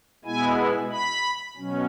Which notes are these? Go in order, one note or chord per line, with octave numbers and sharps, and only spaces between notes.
B2 G#3 B3 E4 G#5
B5
B2 F#3 C#4